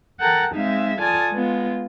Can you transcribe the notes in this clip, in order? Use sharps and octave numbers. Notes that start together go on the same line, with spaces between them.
A4 A#4 F#5 G5 A#5
G#3 C4 D#4 E5 F5
F4 A4 D5 G#5 A5 D#6
G#3 B3 F4